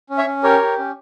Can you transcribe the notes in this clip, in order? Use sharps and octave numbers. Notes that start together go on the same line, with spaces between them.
C#4
C#5 E5
C#4
G4 A#4 C#5
G4
C#4